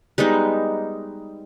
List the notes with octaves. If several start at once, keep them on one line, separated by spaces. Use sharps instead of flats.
G3 G#3 B3 D#4